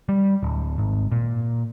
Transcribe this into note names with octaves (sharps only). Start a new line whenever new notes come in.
G3
D1
G#1
A#2